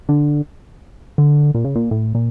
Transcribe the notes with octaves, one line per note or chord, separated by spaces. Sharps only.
D3
D3
A#2
C#3
A#2
A2
A#2